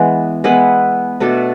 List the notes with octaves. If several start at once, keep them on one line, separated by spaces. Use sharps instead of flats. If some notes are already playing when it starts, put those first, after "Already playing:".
Already playing: E3 G#3 B3
G#3 B3 E4 B4
B2 A3 D4 A4